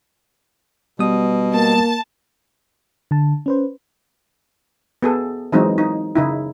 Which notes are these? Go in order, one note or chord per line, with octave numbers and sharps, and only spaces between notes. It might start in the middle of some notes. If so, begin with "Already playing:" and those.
B2 G3 B3 D#6
A#3 A5
D3 A5
C#4 B4 C5
B3 G#4 A4
E3 F#3 G#3 C4 D#4
D#4
C#3 D#4 E4